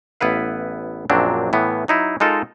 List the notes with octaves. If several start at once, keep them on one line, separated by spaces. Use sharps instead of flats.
A1 B3 E4 B4 F5
A#1 F#2 A#2 F#3 C4 D4
A2 E3 B3
F#3 D#4 E4
G#3 D#4 F4 A4 A#4